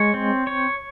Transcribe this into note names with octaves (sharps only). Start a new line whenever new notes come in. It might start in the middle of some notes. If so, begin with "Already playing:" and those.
Already playing: G#3 C#5
C4
C#5